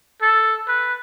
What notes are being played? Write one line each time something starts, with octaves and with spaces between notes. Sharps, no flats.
A4
B4